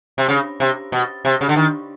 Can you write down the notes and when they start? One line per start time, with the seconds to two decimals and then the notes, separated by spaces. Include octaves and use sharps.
0.18 C3
0.28 C#3
0.60 C3
0.92 B2
1.25 C3
1.41 C#3
1.49 D3
1.56 D#3